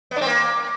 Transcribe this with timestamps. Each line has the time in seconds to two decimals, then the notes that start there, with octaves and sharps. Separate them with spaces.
0.11 B3
0.16 D4
0.21 C4
0.26 A#3